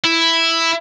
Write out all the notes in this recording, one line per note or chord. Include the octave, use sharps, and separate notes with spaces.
E4